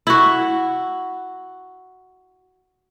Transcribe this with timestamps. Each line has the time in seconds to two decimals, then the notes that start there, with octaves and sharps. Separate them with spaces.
0.07 E4 F#4